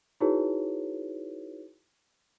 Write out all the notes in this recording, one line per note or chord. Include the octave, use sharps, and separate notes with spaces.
D#4 E4 F#4 G#4 B4 C#5